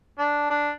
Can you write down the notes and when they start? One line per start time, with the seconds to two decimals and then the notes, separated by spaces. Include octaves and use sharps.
0.19 D4
0.50 D4